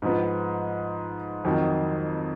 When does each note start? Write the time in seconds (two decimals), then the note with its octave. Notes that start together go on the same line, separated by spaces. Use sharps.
0.02 G#2 F3 B3
1.45 F2 D#3 F#3